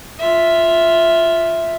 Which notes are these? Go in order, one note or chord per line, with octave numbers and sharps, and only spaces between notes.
F4 E5